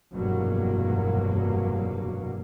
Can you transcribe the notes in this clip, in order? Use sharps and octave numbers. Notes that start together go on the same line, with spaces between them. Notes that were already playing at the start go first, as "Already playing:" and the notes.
F1 E2 G2 B2 F#3 A#3